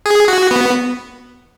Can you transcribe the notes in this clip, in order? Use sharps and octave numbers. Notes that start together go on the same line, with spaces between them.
G#4
F#4
B3